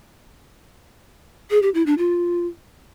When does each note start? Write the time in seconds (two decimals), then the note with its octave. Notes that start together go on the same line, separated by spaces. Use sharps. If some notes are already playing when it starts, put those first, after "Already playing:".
1.51 G#4
1.62 G4
1.74 E4
1.86 D4
1.98 F4